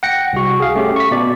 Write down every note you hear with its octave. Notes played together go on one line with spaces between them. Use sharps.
F#5 G5 A#6 C#7
C2 F#4
G#4 F5
A3 C#4 G4
C#6 B6
B2 D5